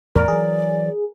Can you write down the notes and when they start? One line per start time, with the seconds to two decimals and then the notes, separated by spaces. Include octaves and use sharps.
0.16 E2 A2 A#4 D5
0.28 E3 F#3 G#4